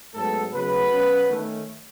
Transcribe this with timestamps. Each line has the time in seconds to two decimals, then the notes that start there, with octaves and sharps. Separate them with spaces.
0.14 G#2 F#3 A3 B3 A4
0.53 C#3 F#3 A3 B3 B4
0.91 B2 F#3 C#4
1.29 D#3 A3 C#4